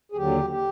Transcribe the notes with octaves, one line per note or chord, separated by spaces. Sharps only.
G#4
D#2 D3 F#3 G4
G4